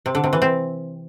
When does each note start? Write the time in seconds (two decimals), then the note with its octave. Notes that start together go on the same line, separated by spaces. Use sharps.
0.06 C3
0.15 D3
0.24 C3
0.33 E3
0.42 C4